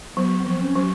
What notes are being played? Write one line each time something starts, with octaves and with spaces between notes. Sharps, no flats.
F#3 B3
C4
F3
C#4
F#3